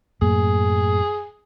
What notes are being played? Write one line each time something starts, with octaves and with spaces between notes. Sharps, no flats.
F#2 A2 A#3 G#4